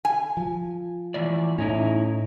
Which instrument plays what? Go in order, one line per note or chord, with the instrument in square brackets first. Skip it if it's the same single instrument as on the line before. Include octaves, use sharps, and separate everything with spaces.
[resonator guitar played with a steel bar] G#5
[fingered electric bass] F3
[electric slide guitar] E3 A3 D5
[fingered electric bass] A2 [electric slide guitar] C#4 D#4 E4